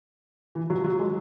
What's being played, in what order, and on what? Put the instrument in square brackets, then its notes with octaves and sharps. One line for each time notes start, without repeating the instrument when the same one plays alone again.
[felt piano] E3
F#3
F#3
G#3